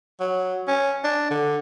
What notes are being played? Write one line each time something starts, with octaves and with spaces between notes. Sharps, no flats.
F#3
C#4
D4
D3